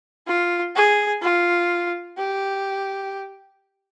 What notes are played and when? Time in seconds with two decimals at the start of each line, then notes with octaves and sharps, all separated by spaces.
0.27 F4
0.76 G#4
1.22 F4
2.18 G4